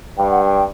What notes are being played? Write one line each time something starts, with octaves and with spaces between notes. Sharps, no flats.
G2 G5
F#5
G5